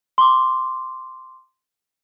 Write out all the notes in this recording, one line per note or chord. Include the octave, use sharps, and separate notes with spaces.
C6 D6